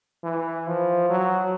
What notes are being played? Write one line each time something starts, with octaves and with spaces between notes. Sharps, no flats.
E3
F3
F#3